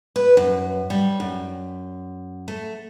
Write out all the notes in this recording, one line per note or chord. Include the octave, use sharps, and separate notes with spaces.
B4
F#2
G3
F#2
A3